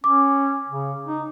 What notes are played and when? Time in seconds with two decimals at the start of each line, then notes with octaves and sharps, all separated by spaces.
0.04 C#4 D6
0.69 C#3
1.07 D#4